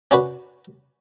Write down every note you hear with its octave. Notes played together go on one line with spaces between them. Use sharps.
C#4 D4 F#4 B4